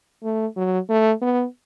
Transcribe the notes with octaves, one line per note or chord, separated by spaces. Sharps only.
A3
F#3
A3
B3